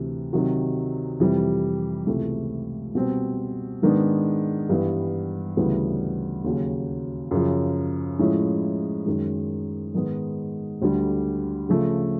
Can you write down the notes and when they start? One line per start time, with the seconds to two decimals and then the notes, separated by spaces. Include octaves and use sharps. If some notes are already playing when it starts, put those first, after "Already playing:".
Already playing: D2 C3 E3
0.33 C3 D#3 F#3
1.20 F2 C3 E3 G3
2.07 C#2 C3 E3 A3
2.95 B2 G3 C4
3.82 G#2 D#3 G#3 B3 D4
4.69 G2 E3 G3 B3
5.57 D2 C#3 E3 G3 B3
6.44 D#2 C#3 F#3
7.31 F#2 C#3 F3
8.19 A2 F3 G#3 C#4 E4
9.06 F#2 D#3 G#3
9.94 G#2 D#3 G#3 B3
10.82 D2 D3 G3
11.69 C#3 F3 A3